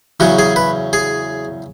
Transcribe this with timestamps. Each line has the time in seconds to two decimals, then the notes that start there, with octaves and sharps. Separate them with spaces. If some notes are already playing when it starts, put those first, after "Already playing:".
0.20 E2 C#3 F#3 F#4
0.39 G#4
0.56 B4
0.93 G#4